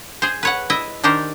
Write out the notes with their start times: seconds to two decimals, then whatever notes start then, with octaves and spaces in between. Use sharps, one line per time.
0.22 G#4 C5
0.43 B4 C#5 F#5
0.70 E4 D#5 E5
1.04 D#3 D4 G4 A#4 C5